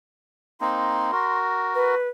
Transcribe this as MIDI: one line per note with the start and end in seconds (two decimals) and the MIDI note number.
0.61 1.11 58
0.61 1.11 60
0.61 1.11 63
0.61 1.37 84
1.12 1.95 66
1.12 1.95 70
1.75 2.08 71